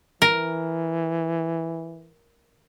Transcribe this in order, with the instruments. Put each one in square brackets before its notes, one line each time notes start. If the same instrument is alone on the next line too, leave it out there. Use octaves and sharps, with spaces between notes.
[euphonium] E3 [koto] A#4